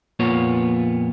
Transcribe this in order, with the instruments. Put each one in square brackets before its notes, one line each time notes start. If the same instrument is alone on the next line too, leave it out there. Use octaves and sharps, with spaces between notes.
[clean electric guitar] F2 A#2 A#3 B3 F4 C#5